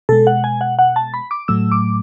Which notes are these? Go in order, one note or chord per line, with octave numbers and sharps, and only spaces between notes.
B2 G#3 A4
F#5
G#5
F#5
F#5
A5
B5
D6
A2 F#3 A3 E6
D6